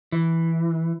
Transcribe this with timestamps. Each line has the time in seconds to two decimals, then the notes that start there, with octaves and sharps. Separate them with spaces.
0.12 E3